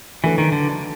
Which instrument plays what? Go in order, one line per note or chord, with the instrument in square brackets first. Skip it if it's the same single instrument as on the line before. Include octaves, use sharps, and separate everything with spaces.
[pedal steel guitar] E3 [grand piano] F#3 A3 D4 F#4 B4
[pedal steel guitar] D#3
D3